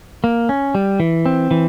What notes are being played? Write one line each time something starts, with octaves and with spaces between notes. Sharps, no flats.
A#3
C#4
G3
E3
C4
E3